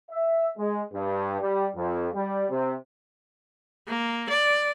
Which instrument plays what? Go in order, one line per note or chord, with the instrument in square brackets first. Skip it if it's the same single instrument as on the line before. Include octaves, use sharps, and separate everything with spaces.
[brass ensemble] E5
G#3
G2
G3
F2
G3
C3
[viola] A#3
D5